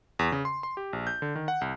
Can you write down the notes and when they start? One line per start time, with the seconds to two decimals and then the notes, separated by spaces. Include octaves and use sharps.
0.19 E2
0.32 C#3
0.45 C6
0.63 C6
0.77 G4
0.93 A#1
1.07 G6
1.22 D3
1.36 D#3
1.48 F#5
1.61 C2